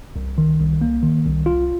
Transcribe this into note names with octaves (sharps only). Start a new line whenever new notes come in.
C2
D#3
C2
A#3
D#3
C2
F4